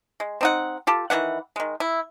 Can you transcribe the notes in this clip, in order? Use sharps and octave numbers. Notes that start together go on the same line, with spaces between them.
G#3
C4 D#4 F#5
F4 G4 A4
D#3 E3 B3 F#5
D#3 G#3
E4